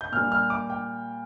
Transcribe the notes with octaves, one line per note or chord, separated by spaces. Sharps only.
G6
A#2 G3 F6
F6
D6
G5